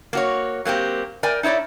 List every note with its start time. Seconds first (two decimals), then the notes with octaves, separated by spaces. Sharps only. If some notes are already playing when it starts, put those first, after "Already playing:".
0.13 A#3 F#4 C#5
0.65 F#3 A#3 C4 G4
1.23 A#4 D5 G5 G#5
1.43 D#4 E4 C#5 D5